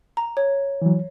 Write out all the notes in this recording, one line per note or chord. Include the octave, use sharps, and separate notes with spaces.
A#5
C#5
E3 F#3